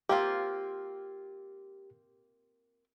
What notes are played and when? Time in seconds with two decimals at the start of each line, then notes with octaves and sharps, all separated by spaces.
0.09 A#3 C4 F4 G4